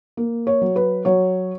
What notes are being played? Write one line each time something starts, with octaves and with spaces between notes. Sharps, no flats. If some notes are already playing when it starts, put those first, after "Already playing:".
A#3
C#5
F#3
B4
F#3 C#5